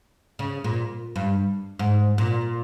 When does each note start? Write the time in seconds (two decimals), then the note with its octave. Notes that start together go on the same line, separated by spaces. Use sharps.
0.39 C#3
0.64 A#2
1.16 G2
1.79 G#2
2.18 A#2